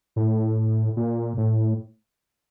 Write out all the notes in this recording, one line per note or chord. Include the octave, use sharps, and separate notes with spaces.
A2
A#2
A2